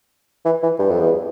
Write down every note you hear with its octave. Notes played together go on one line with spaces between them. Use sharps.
E3
E3
G2
F2
E2